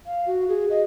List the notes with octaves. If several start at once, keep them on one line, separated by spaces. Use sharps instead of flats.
F5
F#4
G#4
D#5